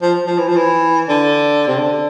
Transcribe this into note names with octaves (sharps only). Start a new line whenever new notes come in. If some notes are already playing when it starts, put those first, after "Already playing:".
F3
F3
E3
F3
E3
D3
C3
D3